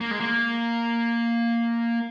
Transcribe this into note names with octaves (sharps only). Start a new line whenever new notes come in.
A#3
G#3
A#3